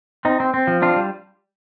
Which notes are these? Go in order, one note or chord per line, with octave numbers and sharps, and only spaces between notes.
C4 D#4
C4
C4
F3
C4 D4 F4
G3